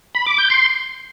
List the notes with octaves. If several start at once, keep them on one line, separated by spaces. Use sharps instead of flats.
B5
D6
G6
C6